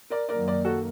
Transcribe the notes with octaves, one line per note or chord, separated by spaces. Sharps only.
A#4 D5
F#2 D#3 F#3 A#3 A#4 D5
A#4 D5
F#4 A4